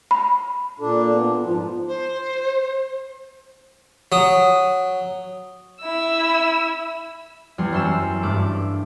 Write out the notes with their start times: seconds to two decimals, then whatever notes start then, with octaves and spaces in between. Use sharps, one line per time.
0.11 B5
0.80 A#2 D4 A4
1.12 B3
1.44 G#2 F3 F4
1.88 C5
4.12 F#3 D#6
5.81 E4 E6
7.58 E2 G3 C6
7.73 F#2 C6 E6 C7
8.23 G2 A3 D6